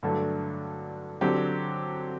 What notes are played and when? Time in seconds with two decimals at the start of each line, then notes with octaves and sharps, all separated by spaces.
0.03 G2 D3 F#3 A3
1.21 D3 F#3 C4 G4